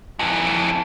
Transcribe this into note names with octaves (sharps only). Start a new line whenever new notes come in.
F2 E3